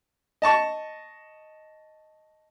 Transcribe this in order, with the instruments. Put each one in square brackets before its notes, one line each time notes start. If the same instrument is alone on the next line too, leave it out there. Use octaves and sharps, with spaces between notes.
[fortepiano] D#5 A5 C#6